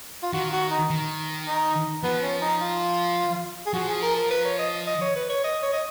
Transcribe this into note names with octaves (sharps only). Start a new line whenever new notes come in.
F4
D#3 F#4
F#4
D#4
D#3
D#4
F3 B3
C#4
D#4
F4
G#4
F3 F#4
G#4
A#4
A#4
B4
C#5
D#5
D#5
C#5
B4
C#5
D#5
C#5
D#5